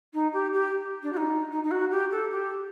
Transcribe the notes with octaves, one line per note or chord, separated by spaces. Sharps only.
D#4
G4
G4
D4
F#4
D#4
D#4
D#4
F#4
G4
A4
G4